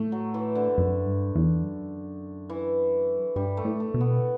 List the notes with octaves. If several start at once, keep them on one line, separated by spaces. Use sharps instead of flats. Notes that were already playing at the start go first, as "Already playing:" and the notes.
Already playing: A2 A3
F#3
E3
D3
F#2
G2
E2
F#2
E3
G2 G3
A3
A2
A3
B2
B3